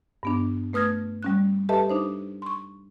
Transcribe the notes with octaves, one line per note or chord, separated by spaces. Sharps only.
G2 B3 D4
A3 B4 D#6 F6 G#6 A#6
G3 C#4 F#6
G4 A4 B4 D#5 E5 A5
D4 D#4 C5
C6 C#6